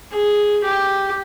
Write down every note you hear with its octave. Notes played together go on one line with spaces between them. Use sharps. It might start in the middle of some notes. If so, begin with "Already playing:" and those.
G#4
G4